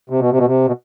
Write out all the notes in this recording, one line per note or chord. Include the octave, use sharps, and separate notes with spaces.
C3
B2
C3
B2
C3
B2